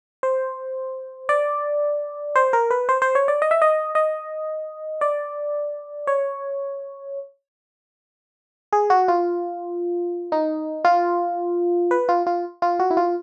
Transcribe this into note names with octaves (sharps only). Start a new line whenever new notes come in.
C5
D5
C5
A#4
B4
C5
C5
C#5
D5
D#5
E5
D#5
D#5
D5
C#5
G#4
F#4
F4
D#4
F4
B4
F4
F4
F4
F#4
E4
F4